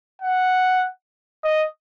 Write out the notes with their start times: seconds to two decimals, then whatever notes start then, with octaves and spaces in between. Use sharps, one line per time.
0.22 F#5
1.44 D#5